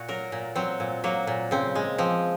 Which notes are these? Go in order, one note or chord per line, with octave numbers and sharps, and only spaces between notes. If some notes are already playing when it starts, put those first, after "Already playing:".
Already playing: A#2 F#4
F#3 A#4
A#2
F#3 C4
A#2
F#3 A#3
A#2
C#3 C4
G#3
F3 C4